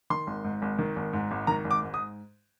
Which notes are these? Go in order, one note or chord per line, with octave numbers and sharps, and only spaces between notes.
D#3 C6
G#1
G#2
G#1
D#3
G#1
G#2
G#1
D#3 A#5
G#1
D6
G#2
D#6